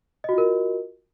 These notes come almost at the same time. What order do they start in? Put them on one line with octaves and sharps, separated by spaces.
D#5 F#4 F4 A#4